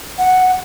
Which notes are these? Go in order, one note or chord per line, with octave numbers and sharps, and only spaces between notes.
F#5